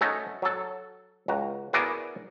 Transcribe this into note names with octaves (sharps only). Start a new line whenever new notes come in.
A3 C#4 D#4 F#4 A4
F#3 A4
C#2 F#4 A#5
B3 E4 F#4 G#4 A#4 D5